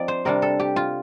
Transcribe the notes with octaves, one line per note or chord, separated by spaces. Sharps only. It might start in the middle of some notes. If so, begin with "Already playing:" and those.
Already playing: F3 C4 D#4 D5
C5
C3 G3 D4 A#4
A4
G4
F4